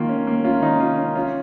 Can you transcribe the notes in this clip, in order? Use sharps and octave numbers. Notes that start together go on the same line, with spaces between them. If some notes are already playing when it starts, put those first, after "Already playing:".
Already playing: D#3 A#3 F4
C#4
A#3
C#4 F4
D#3 D#4
C#4 F4
C#4
C#4 F4